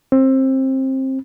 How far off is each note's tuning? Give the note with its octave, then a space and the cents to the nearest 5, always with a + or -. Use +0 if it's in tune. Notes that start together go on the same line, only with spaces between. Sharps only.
C4 +20